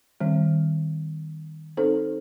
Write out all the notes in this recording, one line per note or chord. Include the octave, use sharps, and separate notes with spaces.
D#3 G3 C4
C4 D#4 A4 C5